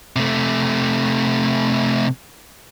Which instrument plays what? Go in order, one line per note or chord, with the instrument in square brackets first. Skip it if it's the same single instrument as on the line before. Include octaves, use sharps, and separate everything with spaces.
[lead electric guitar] C3 A3